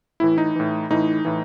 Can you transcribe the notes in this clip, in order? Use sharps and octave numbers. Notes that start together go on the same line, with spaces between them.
A2 E3 E4
D#4
A2 E3
A2 E3 D#4
A2 E3